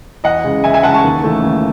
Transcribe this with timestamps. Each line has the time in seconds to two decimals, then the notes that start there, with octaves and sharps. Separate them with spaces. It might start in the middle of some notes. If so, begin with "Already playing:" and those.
0.24 E2 D#5 F#5
0.44 C#3 G#3
0.64 E2 E5 G#5
0.74 E5 G#5
0.83 C#3 G#3 F#5 A5
0.94 A5 C#6
1.04 D#2
1.23 C#3 E3 A3
1.43 D#2